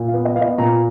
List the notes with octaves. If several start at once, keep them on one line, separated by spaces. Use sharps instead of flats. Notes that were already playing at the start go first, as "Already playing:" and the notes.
Already playing: A#2
F5
B3
D#5
B3 F5
D#5
A#2 A#5